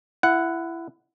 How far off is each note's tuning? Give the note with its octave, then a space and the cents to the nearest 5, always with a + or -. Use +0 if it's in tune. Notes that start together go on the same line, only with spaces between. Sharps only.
E4 +20 F#5 +0